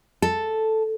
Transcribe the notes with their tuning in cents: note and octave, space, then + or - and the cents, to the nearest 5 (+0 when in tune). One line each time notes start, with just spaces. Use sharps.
A4 +0